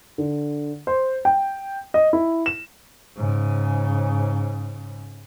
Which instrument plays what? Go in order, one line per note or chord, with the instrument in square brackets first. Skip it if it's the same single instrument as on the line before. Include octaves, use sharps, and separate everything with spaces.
[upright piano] D3
C5
G5
D#5
E4
E7
[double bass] G#2 C#3